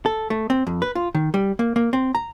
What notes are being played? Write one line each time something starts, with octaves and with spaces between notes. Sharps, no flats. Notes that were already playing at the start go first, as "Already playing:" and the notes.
A4
A3
C4
F2
B4
F4
D#3
G3
A#3
A#3
C4
A#5